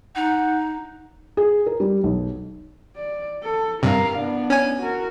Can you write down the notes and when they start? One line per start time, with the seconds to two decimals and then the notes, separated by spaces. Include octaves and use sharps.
0.16 D#4 F#5
1.37 G#4
1.66 A#4
1.80 G3
2.03 B1
2.96 D5
3.44 A4
3.83 G2 C3 A#4 F5
4.16 B3 D4
4.50 C#4 G#5
4.80 F#4 A#4